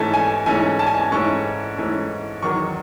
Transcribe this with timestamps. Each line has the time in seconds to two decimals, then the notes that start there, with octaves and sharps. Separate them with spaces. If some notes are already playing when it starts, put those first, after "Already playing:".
Already playing: G#2 E3 A3 C#4 A5
0.14 G#5
0.46 G#2 E3 A3 C#4 G#5
0.79 A5
0.87 G#5
0.94 A5
1.12 G#2 E3 A3 C#4 C#6
1.77 G#2 E3 A3 C#4
2.43 E2 D#3 F#3 C#6